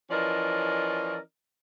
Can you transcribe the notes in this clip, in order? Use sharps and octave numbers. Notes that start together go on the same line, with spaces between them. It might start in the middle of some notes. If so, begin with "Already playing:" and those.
E3 F3 C#4 A#4 D5 D#5